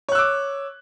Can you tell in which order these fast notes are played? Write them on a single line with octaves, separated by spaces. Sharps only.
C#5 F#6 E6 D6